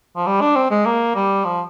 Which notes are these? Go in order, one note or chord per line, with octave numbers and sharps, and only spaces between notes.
F3
G3
D4
C4
G#3
A#3
G3
F3